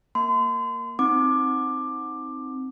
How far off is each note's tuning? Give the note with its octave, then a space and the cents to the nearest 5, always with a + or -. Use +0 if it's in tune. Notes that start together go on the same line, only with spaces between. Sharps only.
A#3 +0 C6 -35
C4 +0 D#4 +10 D6 +15